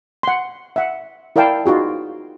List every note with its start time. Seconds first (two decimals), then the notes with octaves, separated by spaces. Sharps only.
0.23 F#5 C6
0.76 E5 F#5
1.36 E4 A#4 D5 F5 G5 A5
1.66 D#4 F4 F#4 G#4